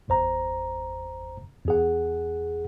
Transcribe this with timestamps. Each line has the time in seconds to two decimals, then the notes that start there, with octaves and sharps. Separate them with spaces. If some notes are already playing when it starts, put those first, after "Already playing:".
0.08 G1 E2 C5 A#5
1.66 E2 G#4 F#5